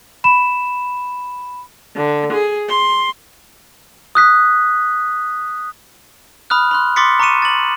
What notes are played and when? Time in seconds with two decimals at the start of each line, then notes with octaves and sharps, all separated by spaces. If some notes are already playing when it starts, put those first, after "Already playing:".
0.24 B5 E7
1.96 D3
2.33 G#4
2.69 C6
4.15 D#6 F#6 B6
6.50 B5 D#6 F6 F#6
6.71 B5 C6 F#6
6.96 C6 D6 D#6 A6 B6 C#7
7.20 A#5 C#6 D6 C#7 D#7 E7
7.42 A6 F#7